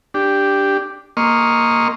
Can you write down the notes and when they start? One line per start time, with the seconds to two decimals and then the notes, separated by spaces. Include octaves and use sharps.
0.14 D4 G4
1.17 A#3 D#5 C6 C#6 F6